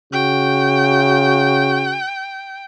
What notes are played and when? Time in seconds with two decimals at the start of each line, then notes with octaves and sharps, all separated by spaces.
0.13 C#3 F#4 G5